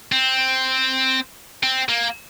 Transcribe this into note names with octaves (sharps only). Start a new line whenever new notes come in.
C4
C4
A#3